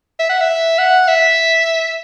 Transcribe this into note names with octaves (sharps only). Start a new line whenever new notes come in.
E5
F#5
E5
F#5
E5